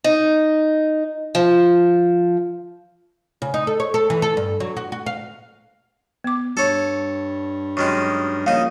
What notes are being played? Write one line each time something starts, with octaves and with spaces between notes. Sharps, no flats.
D#4
F3
C#3
D#4
A4
C#5
A4
E3
A4
G2
F#3
F#4
F#4
F5
B3 D6
G2 A4 C#5
F#2 D#3 G#3 C#6
A#1 C#3 D#4 F5